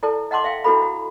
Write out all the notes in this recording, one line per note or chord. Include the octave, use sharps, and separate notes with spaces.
E4 A4 D5 A5
D#5 F#5 A5 C6 D6
E5 F5 G5
D4 E4 F#4 A4 B5
F#4